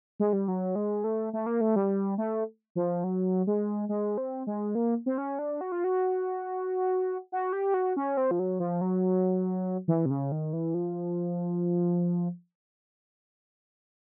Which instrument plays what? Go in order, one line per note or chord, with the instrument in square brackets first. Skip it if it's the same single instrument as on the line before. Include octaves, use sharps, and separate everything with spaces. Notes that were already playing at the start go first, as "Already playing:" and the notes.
[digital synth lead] G#3
G3
F#3
G#3
A3
A3
A#3
A3
G3
A3
F3
F#3
G#3
G#3
C4
G#3
A#3
C4
C#4
D4
F#4
F4
F#4
F#4
G4
F#4
C#4
C4
F3
F#3
F3
F#3
E3
C3
C#3
D#3
E3
F3